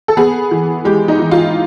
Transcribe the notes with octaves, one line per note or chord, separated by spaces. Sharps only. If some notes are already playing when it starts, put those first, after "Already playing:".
A4
B3 G#4
E3
G#3 G4
D#4
E3
F4